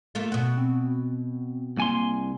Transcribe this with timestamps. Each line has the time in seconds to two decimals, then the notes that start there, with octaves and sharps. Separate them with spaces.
0.15 A3 A#3 F4
0.32 B2 F#4
0.57 C4
1.77 C2 A#3 G#5 C6